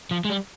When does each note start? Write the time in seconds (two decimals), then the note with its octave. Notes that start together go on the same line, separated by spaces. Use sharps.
0.11 F3
0.25 G#3
0.30 G3